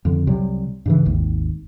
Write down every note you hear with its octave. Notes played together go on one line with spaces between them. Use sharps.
F2 D3
C2 C3 F#3 G3
G2 C#3 E3
G#1 D#2